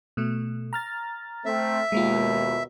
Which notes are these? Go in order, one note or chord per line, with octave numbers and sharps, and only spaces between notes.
B2 A3
A#5 F6 A6
A3 C4 E5
D#2 B2 G#3 A#3 F4